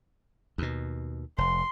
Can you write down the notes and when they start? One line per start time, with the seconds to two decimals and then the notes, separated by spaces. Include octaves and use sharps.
0.58 D#2 B2
1.38 F1 C6